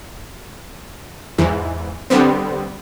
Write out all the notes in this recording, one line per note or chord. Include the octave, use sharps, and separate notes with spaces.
E2 G#2 E3
D3 G3 B3 C4